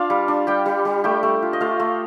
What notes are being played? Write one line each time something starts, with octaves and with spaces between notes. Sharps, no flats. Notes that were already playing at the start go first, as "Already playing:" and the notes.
Already playing: D4 F4 F5
G3
D4
G3 G4 G5
G3
G3
A3 G4 G5
A3
F4
D#5
A3 F4 F5
A3